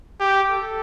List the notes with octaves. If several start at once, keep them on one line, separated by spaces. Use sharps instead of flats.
G4
A4